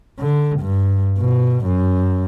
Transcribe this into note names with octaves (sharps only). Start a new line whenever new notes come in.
D3
G2
B2
F#2